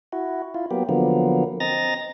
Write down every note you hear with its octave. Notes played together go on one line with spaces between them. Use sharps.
E4 F#4
E4 F4
F#3 A#3 B3 G4
D3 F3 F#3 A#3 B3
C4 D#5 A#5 A6 A#6